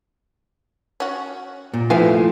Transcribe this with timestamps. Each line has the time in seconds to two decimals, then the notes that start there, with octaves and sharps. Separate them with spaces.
1.00 C#4 F#4
1.74 A#2
1.90 F3 A3 E4 B4 F5 G#5